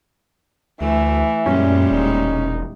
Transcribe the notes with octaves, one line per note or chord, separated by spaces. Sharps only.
D2 E3 A3
F#2 A#2 G3 G#3 C#4
E1 D#4